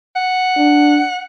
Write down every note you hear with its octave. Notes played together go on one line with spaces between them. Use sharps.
F#5
D4